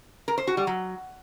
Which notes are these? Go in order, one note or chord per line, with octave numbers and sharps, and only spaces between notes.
A#4
C5
F#4
G3
F#3